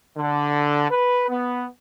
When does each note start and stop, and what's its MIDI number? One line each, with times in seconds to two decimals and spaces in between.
0.18 0.86 50
0.91 1.29 71
1.29 1.65 59